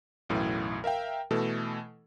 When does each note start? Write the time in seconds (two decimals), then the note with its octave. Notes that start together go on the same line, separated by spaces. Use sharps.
0.29 B1 F#2 A2 E3
0.84 A#4 E5 F5 G5
1.31 B2 E3 A3 A4